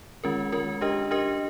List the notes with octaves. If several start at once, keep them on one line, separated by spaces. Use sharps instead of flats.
D#3 G#3 C#4 F4 A#4
D#3 G#3 C#4 F4 A#4
D4 G4 A#4 D#5
D4 G4 A#4 D#5